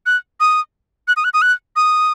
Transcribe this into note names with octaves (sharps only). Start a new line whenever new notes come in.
F#6
D#6
F#6
D#6
F#6
D#6
F#6
D#6